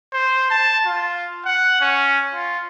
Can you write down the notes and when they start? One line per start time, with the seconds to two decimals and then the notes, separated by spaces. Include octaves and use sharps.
0.13 C5
0.50 A5
0.86 F4
1.46 F#5
1.81 C#4
2.34 F4